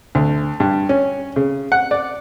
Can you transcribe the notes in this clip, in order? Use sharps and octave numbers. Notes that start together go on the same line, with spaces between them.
D2
G2
C#4
C#3
F#5
D5